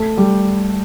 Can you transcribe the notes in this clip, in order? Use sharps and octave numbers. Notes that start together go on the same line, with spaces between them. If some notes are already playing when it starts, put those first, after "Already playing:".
Already playing: A3 A4
G3 G4